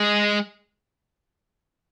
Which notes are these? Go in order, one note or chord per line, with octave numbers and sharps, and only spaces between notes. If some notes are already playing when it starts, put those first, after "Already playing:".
Already playing: G#3